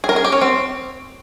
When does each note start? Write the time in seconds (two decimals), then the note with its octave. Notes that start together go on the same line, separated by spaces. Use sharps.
0.04 G#4
0.09 A#4
0.16 G#4
0.24 G4
0.32 C#4
0.41 C4